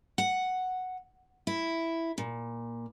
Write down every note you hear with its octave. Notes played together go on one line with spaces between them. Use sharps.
F#5
E4
A#2